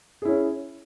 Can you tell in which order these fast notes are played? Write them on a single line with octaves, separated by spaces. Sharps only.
G#4 E4 C#4